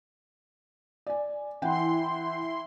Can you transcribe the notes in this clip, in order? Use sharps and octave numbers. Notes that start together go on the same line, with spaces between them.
D5 G#5
E3 E4 F#5 G5 C6